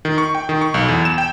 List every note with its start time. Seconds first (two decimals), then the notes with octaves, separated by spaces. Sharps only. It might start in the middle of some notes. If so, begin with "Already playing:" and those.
0.05 D#3
0.18 C#6
0.35 G5
0.49 D#3
0.61 C#6
0.74 B1
0.88 E2
1.05 E7
1.18 G5